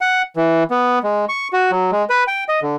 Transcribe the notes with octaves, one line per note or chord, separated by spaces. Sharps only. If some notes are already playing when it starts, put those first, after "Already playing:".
F#5
E3
B3
G#3
C#6
F#4
F#3
G#3
B4
G5
D#5
D3